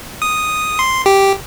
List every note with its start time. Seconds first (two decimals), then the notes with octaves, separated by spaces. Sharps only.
0.22 D#6
0.79 C6
1.06 G4